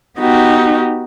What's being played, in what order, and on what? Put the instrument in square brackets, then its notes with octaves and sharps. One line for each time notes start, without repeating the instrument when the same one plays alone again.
[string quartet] B3 D#4 F#4 G4